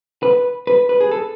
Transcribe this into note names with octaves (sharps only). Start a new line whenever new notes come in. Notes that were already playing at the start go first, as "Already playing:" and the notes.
B4
B4
B4
G#4
A4